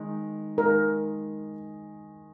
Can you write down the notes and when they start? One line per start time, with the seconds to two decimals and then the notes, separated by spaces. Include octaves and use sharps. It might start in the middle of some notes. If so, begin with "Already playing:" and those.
Already playing: D#3 G#3 D#4
0.58 D#3 G#3 D#4 A#4